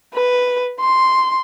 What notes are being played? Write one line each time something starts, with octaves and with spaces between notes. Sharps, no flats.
B4
C6